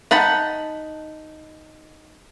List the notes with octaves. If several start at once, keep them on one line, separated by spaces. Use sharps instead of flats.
D#4 F#5 A5 B5